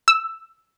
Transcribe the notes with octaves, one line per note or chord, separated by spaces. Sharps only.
E6